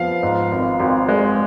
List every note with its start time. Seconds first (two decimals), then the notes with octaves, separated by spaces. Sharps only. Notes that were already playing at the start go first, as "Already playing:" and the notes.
Already playing: F3 B3 F5
0.23 G#2
0.52 G#1
0.80 G#1
1.09 G#3